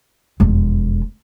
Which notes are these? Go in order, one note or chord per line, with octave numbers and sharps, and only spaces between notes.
E1 F2